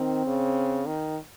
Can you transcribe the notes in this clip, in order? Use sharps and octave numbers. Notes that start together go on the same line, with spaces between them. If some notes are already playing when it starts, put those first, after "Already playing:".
Already playing: D#3 C4
C#3
D#3